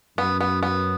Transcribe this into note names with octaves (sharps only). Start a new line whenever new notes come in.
F#2 B3
B3
B3